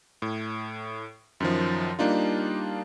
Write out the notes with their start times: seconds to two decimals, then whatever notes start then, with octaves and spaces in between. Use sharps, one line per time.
0.22 A2
1.40 F#2 D#3 F3
1.99 G3 A#3 D4 D#4 F4